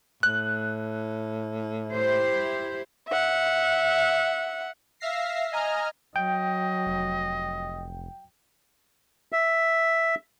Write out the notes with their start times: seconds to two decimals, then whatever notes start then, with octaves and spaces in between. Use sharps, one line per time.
0.23 A2 F#6
1.90 E4 G4 C5
3.08 E5 F#5
5.00 E5 F5 A#6 C7
5.51 D#5 G#5 A#5 F6
6.16 F#3 D#5 G5
6.86 F1
9.32 E5